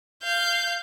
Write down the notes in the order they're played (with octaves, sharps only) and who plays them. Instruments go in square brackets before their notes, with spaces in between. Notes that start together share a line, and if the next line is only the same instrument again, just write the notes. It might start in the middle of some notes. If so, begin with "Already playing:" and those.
[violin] F5 G6